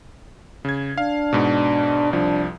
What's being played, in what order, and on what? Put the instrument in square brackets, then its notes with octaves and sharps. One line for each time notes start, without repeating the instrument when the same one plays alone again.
[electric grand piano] C#3 G#6
[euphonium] D4 [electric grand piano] F5
[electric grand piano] G#2 B2
[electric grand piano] C2 F3 [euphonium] D4